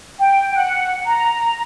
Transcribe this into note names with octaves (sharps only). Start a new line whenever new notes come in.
G5
F#5
A#5